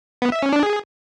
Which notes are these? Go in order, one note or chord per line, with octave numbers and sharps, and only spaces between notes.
B3
E5
C#4
D4
G#4